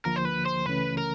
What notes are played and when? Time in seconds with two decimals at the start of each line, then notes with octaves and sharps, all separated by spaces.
0.05 D2 D3 F3 A#3 A#4
0.16 C5
0.25 B4
0.46 C5
0.66 C#2 C#3 E3 A3 C#4 B4
0.97 A#4